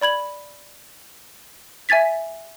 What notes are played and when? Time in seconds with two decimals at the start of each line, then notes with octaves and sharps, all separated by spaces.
0.01 D5 B5 G#6 F#7
1.89 E5 G#5 G#6 A6 B6